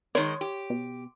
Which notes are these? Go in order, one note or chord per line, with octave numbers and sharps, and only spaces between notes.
D#3 G#3 C#5
G4
B2